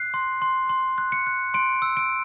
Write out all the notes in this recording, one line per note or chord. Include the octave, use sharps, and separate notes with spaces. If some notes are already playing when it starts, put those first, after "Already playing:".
Already playing: F#6 C7
C6
C6
C6
F#6
C#7
F#6
C6 D7
E6
D7